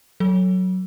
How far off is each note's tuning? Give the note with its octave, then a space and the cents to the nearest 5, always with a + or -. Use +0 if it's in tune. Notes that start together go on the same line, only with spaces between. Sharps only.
F#3 +0 A4 +0